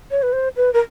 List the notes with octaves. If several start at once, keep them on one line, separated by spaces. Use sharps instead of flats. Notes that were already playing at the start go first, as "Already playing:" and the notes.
C#5
B4
C5
B4
A#4